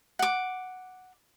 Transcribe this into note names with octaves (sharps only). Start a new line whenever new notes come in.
F#5 D6